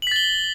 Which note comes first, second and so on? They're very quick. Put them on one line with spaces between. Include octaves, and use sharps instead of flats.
F#7 B6 A6 G7